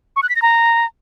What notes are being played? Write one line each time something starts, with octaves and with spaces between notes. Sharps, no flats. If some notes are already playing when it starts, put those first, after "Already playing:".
C#6
F#6
B6
A#6
A#5